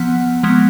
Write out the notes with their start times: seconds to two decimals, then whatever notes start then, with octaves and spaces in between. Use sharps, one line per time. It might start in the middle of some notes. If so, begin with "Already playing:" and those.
Already playing: F3 B3 F#5
0.43 F3 G#3 B3